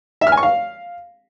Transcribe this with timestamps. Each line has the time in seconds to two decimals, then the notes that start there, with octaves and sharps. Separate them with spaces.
0.21 E5
0.27 F6
0.32 G#5
0.37 C#6
0.43 F5